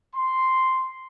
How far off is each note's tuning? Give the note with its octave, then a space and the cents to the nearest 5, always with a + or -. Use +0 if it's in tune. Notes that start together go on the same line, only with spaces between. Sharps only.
C6 -5